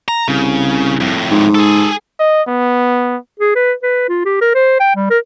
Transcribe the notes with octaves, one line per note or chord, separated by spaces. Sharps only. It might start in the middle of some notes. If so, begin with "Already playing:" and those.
A#5
C2 C#3
F2 A2
G#2
G#4 A4
D#5
B3
G#4
B4
B4
F4
G4
A#4
C5
G5
G3
A#4